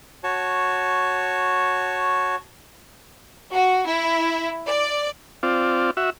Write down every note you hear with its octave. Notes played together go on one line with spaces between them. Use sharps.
F#4 C#5 A5 C#6
F#4
E4
D5
C4 F4 D5
F#4 E5